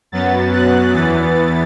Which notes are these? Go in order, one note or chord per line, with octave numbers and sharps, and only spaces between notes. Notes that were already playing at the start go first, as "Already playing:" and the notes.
F#2 F#3 B3 A6
F#6
E2 E3 B3 A6